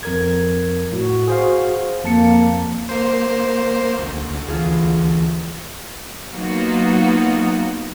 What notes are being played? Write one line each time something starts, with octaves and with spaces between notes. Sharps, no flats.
F2 A#4 G#6
A2 F#4
G#4 C5 F5
F2 A#3 A5 C#7
A#3 C5
D2
E3 F4 G#4
F#3 A#3 B3 D#4 F4 F#4